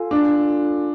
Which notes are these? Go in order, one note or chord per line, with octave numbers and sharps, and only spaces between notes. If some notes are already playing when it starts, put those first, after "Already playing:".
Already playing: F4 A4 F5 G#5
D4